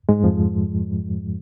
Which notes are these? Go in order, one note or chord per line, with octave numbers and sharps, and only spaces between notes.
G#2 G#3
F2 F3